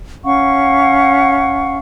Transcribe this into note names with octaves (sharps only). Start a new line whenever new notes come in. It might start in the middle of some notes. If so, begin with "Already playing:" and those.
C#4 F5 F#5 C#6